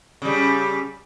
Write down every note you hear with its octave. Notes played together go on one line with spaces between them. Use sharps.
C#3 G3